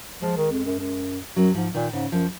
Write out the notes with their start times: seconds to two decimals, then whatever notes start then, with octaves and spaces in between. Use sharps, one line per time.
0.22 F3 G#3
0.37 D#3
0.51 F2
0.65 F#2
0.79 F#2
1.36 F#2 F#3
1.54 G#2 F3
1.74 A#2 D#3
1.93 G#2 C#3
2.12 F#2 F3